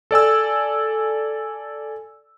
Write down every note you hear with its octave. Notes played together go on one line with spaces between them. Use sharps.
A4 D5 G#5 E6